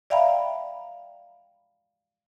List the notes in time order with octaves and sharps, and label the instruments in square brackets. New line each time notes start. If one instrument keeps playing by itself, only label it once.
[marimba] D5 E5 F5 G5 A#5 B5